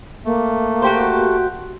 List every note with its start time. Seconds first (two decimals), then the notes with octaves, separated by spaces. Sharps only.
0.25 A3 A#3
0.82 F#4 G4 C5